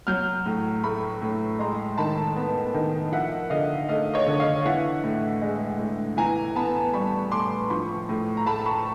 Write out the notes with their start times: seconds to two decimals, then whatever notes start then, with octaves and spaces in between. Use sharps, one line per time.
0.07 F#3 F6 G6
0.46 A2
0.84 A3 B5 C#6
1.22 A2
1.59 G#3 A#5 C6
1.98 D#3 A5 B5
2.36 B3
2.74 D#3
3.12 F3 E5 F#5
3.50 D3 D#5 F5
3.89 A3 D#5 F5
4.14 C#5 D#5
4.26 D3
4.40 D#5 F5
4.66 E3 E5 F#5
5.04 A2
5.42 G#3
5.79 A2
6.17 E3 G#5 A#5
6.55 B3 A5 B5
6.93 G3 B5 C#6
7.32 A2 C6 D6
7.70 F3 B5 C#6
8.09 A2
8.37 A#5
8.46 A3 A5 B5
8.66 B5 C#6